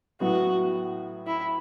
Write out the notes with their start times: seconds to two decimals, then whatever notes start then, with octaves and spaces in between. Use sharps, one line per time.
0.20 A2 F#3 B3 F#4
1.27 E4